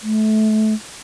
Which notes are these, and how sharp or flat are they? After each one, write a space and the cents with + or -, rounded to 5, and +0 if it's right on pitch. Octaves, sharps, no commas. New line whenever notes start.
A3 -25